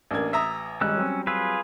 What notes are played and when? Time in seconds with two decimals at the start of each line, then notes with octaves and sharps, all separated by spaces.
0.11 A1 A#3 D4 G#6
0.33 E5 A#5 D#6
0.81 G#1 G3 G#3 C#4 E6 F#6
0.96 F#3 G3 C4
1.27 F4 G#4 B4 E6